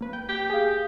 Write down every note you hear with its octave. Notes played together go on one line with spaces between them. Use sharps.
A#3 B4
G5
G4
G#4 F5